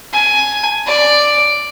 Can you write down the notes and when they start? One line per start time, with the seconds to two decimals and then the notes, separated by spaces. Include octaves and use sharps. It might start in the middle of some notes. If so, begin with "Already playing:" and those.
0.13 G#5
0.87 D5